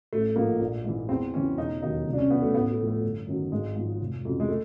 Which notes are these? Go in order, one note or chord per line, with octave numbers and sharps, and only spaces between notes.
A1 A3
G#2 F3 A#3
A#1
G#2 E3
E2 C4
C#3 E3 C#4
E1 D#4
D#2 D#3 F#3 D#4
C2
D4
C#4
B2 F#3 B3
A3
A1 B3
A3
A2 F3
A3
G1
F#2 D#3 F#3
G#1 G#3
G#2 F3
F1
F2 C#3 F#3
G#3
A3